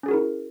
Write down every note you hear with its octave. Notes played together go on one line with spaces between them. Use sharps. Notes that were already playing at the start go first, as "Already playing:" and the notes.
C#4 E4 F#4 G#4 A#4